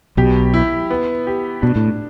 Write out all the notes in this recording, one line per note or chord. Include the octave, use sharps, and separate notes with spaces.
B1 B2 G4
E4
B3
G4
B2 D4
A2